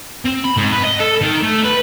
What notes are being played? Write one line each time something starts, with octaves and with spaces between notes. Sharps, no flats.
C4
B5
G#2
B4
D#5
A4
D#3
A3
B4